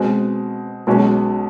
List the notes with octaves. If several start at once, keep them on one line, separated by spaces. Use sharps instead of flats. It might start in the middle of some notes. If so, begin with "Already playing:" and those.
Already playing: B2 G#3 C4
B1 B2 G#3 C#4